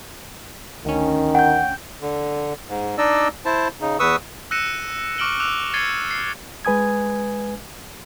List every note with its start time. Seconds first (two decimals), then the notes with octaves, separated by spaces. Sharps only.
0.85 D2 D#3 C#4
1.35 F#5 G5 G6
2.02 D3
2.68 G#2
2.98 D4 D#4 D5 D#5 E6
3.45 E4 C5 A5
3.81 C#3 D#4
3.99 E2 B4 C#6 D#6 E6
4.51 E6 F#6 A#6 C#7 D#7 E7
5.18 C#6 D6 F6 D7 F#7 G7
5.40 D6 E6 F#6 F7
5.74 G#6 A6 C7 C#7 D#7 G7
6.11 C7
6.65 G#3 B4 G#5 D#6 G#6